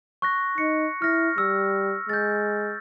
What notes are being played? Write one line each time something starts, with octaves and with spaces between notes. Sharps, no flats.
C#6 F#6 A#6
D#4 C#7
E4 F6 A#6
G3 E6
G#3 G6 A6